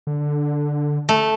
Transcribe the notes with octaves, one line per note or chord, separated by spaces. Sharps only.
D3
A3